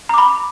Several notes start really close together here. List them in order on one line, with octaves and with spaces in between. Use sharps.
A#5 D6 B5